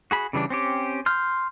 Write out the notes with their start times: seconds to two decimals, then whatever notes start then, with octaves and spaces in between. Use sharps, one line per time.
0.11 F#4 G#4 B5
0.33 C#3 E3 G3 D4
0.50 C4 C#4 G4
1.06 C6 F6 G6